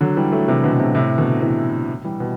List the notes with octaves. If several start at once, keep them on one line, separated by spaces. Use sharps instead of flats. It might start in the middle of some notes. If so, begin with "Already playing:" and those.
D3 F#3
E3 G3
F#3 A3
C3 E3
B2 D3
B2
A2 C3
A2 C3
B2 D3
C3 E3
E3 G3
B2